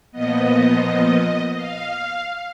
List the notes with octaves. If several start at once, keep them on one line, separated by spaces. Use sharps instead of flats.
A#2 F3 B3 D#5
F5